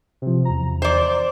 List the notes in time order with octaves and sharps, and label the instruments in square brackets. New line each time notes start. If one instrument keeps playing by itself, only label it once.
[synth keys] C3 F3
E2 A#5
[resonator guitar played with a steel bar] C5 D5